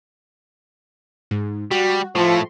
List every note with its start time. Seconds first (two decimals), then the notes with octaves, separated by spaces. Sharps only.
1.31 G#2
1.71 G3 F#4
2.15 A2 F3 A3 C6